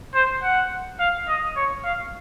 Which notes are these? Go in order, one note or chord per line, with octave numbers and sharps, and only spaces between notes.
C5
F#5
F5
D#5
C#5
F5